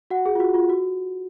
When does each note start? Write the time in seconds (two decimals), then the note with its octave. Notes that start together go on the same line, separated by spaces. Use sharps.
0.10 F#4 F#5
0.26 G#4
0.35 F4
0.40 F#4
0.54 F4
0.69 F#4